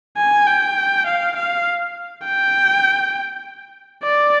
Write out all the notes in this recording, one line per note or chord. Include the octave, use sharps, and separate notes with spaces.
G#5
G5
F5
F5
G5
D5